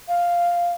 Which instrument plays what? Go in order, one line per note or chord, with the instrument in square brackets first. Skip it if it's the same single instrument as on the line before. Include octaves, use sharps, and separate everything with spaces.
[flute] F5